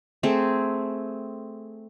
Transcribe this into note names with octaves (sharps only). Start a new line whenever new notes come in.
A3 C4 G#4